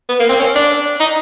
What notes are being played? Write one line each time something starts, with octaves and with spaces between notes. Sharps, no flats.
B3
A#3
C4
C#4
D4
D#4